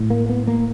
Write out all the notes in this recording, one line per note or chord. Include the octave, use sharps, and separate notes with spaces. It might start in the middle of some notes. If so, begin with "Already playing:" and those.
Already playing: A2
A#3
B3
A#3